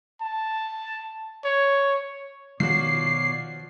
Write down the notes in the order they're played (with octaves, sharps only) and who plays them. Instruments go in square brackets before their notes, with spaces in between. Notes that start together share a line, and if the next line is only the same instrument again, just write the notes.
[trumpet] A5
C#5
[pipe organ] B2 C#5 D5 [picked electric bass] D#3 [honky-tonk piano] F3 F#4 [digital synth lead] C7